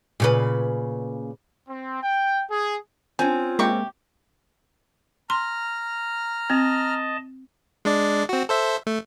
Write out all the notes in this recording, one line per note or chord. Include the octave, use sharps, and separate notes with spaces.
A#2 C#3 B4
C4
G5
G#4
C4 C#4 F4 G#5
C3 G#3 A#3 G4 C#6
A#5 C6 F6
C4 D#5 A5
G#3 D4 D5
C4 F#4
A4 C5 E5
A3